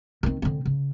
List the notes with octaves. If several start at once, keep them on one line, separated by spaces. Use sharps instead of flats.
D#3 C4
D3 C4
C#3